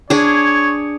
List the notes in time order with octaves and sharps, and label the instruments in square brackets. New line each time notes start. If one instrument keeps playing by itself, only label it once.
[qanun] D4 G#4 [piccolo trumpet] C#5